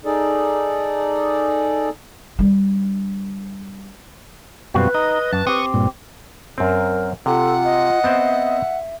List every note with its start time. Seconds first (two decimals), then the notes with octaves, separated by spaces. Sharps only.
0.05 D#4 G#4 A4 D5
2.39 G3 D4
4.74 F#2 B2 G3 C4 F4 F#4 B4
4.94 D#4 D#5
5.33 F#2 A5
5.47 C4 G4 C#6 D#6
5.74 G2 A#2
6.58 F#2 C4 A#4
7.26 C3 F4 A4 F#5
7.64 D#5
8.04 B3 C4 C5 E5